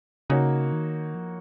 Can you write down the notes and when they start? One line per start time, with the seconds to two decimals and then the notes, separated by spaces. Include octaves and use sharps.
0.30 C#3 A#3 D#4 F#4 C#5
0.73 D#3
1.15 F3